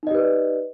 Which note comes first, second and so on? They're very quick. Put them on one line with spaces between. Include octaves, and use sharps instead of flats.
D#4 D#5 G4 B4 D5